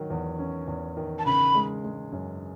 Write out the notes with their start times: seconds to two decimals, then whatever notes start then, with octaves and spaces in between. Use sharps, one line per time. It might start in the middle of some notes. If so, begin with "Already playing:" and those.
Already playing: D#3 F#3
0.10 E2
0.39 C#4
0.68 E2
0.97 D#3
1.19 A5
1.26 C#3 B5
1.55 G#3
1.84 G#3
2.12 F#2